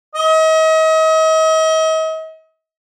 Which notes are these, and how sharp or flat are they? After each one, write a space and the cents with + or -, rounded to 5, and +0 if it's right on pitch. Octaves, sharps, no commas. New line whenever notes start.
D#5 +40